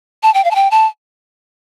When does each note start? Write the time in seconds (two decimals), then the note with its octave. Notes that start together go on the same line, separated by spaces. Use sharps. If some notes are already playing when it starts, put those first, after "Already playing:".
0.23 A5
0.34 G5
0.45 F5
0.51 A5
0.55 G5
0.71 A5